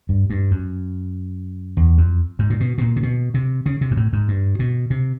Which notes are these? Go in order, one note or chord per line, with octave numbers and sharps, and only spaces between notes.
G2
G2
F#2
E2
F2
G#2
A#2
B2
B2
A#2
C3
B2
C3
C#3
C3
G#2
A2
G#2
G2
B2
C3